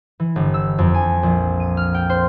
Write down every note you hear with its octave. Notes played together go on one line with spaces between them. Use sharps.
E3
G1
E6
F2
G#5
A#1
D#7
F6
G5
C5